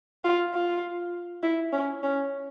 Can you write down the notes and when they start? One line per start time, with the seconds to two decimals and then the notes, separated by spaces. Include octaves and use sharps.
0.24 F4
0.54 F4
1.43 E4
1.72 C#4
2.03 C#4